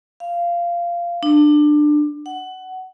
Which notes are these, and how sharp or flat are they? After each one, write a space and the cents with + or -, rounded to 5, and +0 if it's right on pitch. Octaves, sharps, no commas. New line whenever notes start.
F5 -15
D4 +20
F#5 +20